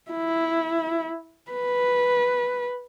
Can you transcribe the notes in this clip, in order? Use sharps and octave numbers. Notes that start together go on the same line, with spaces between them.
E4
B4